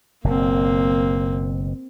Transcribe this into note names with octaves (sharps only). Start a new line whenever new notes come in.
F#1 B2 A#3 C4